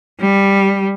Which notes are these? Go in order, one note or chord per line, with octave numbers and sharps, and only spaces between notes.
G3